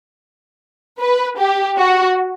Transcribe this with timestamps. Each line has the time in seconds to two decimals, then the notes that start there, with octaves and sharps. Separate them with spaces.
1.00 B4
1.38 G4
1.77 F#4